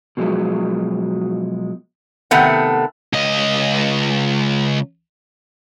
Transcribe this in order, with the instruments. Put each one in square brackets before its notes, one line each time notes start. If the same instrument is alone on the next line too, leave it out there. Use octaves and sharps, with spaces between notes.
[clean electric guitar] B2 F3 F#3 G#3
[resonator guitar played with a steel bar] C3 D#3 A3 B3 F#5
[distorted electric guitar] C#2 D#5